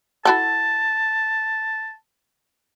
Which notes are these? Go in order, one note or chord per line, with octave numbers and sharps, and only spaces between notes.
E4 F#4 A4 A5